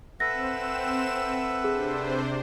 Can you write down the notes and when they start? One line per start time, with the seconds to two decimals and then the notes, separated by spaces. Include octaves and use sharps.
0.20 C4 A4 B4 E5 F#5 A#6 E7
1.64 C3 D4 G#4 C5